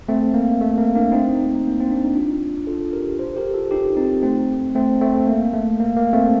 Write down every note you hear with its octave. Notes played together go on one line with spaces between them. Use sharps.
A3 C4
A#3
A3
A#3
A#3 D4
C4 D#4
A#3
C4
D4
D#4
D4 F4
F4 A4
G4 A#4
A4 C5
G4 A#4
F4 A4
D#4 G4
C4 D#4
A3 C4
A3 C4
A3 C4
A#3
A3
A#3
A#3
A3 C4